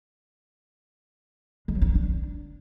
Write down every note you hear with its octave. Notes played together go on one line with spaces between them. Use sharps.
G#3
F#3
D4
C#4
D4